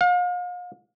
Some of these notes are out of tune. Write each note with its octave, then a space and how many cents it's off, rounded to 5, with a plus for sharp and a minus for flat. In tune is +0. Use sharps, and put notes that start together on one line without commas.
F5 +40